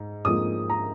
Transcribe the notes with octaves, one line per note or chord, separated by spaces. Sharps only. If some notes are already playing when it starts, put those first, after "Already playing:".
Already playing: G#2
G#2 F3 A#3 D#6
A#5